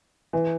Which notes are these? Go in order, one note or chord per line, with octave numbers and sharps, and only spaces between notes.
E3